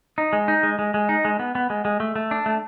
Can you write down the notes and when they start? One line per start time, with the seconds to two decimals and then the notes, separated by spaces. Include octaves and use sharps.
0.18 D#4
0.33 G#3
0.48 D#4
0.63 G#3
0.79 G#3
0.94 G#3
1.09 D#4
1.25 G#3
1.39 B3
1.55 B3
1.70 G#3
1.85 G#3
2.00 A3
2.16 A3
2.31 D4
2.46 A3